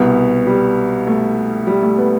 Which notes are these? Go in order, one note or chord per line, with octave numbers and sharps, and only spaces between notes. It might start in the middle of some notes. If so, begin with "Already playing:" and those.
Already playing: C2 B2 B3
G3
A3
G3
A3
B3